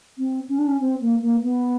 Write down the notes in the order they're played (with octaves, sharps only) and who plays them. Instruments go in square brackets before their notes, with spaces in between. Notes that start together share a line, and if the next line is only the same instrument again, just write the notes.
[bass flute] C4
C#4
D4
C#4
C4
A#3
A#3
B3